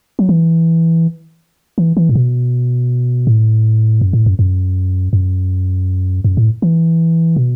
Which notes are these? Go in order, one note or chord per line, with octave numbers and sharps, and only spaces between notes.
F#3
E3
E3
E3
A2
B2
A2
F#2
A2
F#2
F#2
F#2
F#2
A2
E3
B2